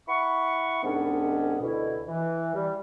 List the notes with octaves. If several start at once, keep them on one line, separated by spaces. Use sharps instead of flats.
E4 F#5 B5 C#6
C2 G#2 D#3 B3 C#4 D4
D2 B2 E4
E3
G3